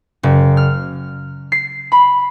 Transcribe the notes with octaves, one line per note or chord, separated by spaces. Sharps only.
F#1
F6
C7
B5